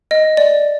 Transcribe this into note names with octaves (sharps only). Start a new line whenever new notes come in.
D#5
D5